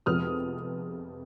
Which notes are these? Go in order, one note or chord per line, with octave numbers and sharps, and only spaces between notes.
F2 C3 F3 G#3 B3 D#6 F6